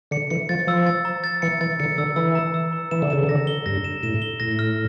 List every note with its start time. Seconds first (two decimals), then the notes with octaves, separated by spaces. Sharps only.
0.11 D3 C#7
0.30 E3 C#7
0.49 F3 A6
0.67 F3 E6
0.86 A6
1.05 A#5
1.24 A6
1.42 E3 C#7
1.61 E3 A6
1.80 D3 C#7
1.98 D3 E6
2.16 E3 E6
2.35 A#5
2.54 E6
2.73 A#5
2.91 E3 E7
3.02 D3
3.10 C#3 E7
3.23 D3
3.29 A#6
3.47 G7
3.66 G2 A#6
3.84 E7
4.03 A2 E7
4.22 G7
4.40 A2 A#6
4.59 F6